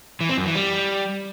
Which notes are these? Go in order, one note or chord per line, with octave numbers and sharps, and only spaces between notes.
E3
C4
F#2
E3
G3